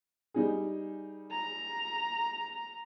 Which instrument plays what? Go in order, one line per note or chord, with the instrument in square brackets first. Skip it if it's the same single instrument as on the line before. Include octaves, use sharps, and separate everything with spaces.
[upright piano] G3 D#4 G#4
[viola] A#5